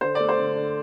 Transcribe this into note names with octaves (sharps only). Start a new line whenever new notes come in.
D3 C5
A3 D5
C5
D3
D3